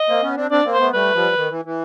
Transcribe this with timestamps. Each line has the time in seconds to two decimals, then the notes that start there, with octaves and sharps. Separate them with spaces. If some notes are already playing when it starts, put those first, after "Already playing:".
Already playing: D#5
0.08 A#3 C4
0.23 B3 C#4
0.37 C4 D4
0.51 C4 D4 D5
0.65 A#3 C4
0.72 C5
0.79 A3 B3
0.93 G3 A3 B4
1.15 F3 G3
1.36 D#3
1.50 E3
1.65 E3